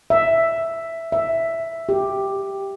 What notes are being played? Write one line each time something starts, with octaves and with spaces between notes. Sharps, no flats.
E5
E5
G4